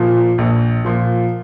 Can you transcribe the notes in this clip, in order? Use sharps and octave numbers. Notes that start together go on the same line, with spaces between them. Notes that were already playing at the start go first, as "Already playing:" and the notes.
Already playing: A#2 F3
A#1
A#2 F3